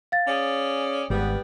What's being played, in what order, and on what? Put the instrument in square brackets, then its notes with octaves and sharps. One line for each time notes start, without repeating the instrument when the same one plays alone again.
[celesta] F5 A6
[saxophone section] C#4 G#4 D5
[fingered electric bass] G#1 [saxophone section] G3 B3